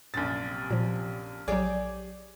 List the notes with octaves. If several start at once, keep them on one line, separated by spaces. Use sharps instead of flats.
A#1 F#2 C3 A6
A#2 F3
A#1 F#3 G4 G#4 C#5 D5